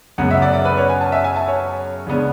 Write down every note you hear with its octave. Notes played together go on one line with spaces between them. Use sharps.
F#2 C#3 G#3 B3 F#5
E5
D5
D5
B4
C#5
G#5
A5
E5
G#5
A5
C#5
C#3 G#3 B3 D4